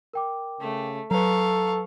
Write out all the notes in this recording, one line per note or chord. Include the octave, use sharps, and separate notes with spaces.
A#4 G5 D6
C#3 A3
F#3 A4 B4 F5 A#5 C#6